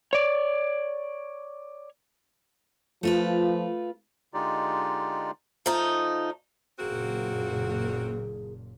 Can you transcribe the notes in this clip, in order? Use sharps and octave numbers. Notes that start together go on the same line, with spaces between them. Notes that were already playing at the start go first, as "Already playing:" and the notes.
C#5 D5
F3 A3 F4 B4
D3 G#3 D#4 F4 G4 D5
F3 A3 D#4
F#1 A#2 A#3 C4 F#4 G#4